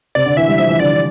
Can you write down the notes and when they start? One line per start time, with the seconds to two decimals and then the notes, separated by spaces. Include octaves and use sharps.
0.15 C3 D5
0.26 D3
0.37 E3 E5
0.48 G3
0.58 F3 E5
0.69 E3
0.79 D3 D5
0.90 D3